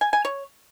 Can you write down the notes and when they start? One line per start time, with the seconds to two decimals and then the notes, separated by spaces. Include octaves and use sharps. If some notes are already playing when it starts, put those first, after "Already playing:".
0.01 G#5
0.13 G#5
0.25 C#5